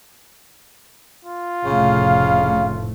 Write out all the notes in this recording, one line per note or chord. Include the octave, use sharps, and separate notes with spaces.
F4
F1 A2 C#3 A3 F5